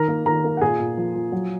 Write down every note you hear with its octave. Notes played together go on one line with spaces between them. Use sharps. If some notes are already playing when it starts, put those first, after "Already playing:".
Already playing: D#3 A#4 A#5
A#3
D#3 A#4 A#5
A#3
F#5
A#2 G#4 G#5
A#2
F3
F3
F#3